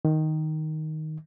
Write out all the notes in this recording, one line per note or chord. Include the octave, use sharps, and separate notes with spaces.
D#3